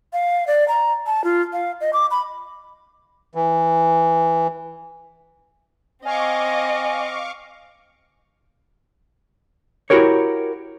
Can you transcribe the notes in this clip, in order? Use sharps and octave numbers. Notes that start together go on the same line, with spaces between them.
F5
D5
A#5
A5
F4
F5
D#5
D6
B5
E3
C4 D#5 F5 G#5 C#6 D6
E4 F#4 G4 A#4 C#5